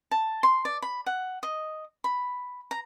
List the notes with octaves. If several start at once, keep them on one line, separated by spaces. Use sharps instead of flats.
A5
C6
D5
B5
F#5
D#5
B5
A#5